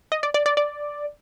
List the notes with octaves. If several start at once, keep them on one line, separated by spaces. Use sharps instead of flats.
D#5
D5
D5
D5
D5